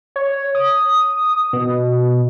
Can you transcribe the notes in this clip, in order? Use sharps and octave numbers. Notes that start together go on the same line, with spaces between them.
C#5
D#6
B2